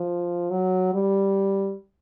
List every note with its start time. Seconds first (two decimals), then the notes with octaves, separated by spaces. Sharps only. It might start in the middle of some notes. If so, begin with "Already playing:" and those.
Already playing: F3
0.50 F#3
0.94 G3